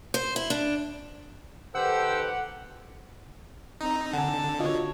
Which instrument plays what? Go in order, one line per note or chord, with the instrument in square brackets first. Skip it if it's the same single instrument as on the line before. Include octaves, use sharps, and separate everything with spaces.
[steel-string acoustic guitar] C5
E4
D4
[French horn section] D#3 A4 B4 [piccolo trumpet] G4 [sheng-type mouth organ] C5 E6 [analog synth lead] F#5
[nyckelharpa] C4 A#5 [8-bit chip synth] D#4
[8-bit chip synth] D3 [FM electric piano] F#5 G#5 [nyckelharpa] A5
[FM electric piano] F4 D#5 A5 [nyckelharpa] F#4 C#5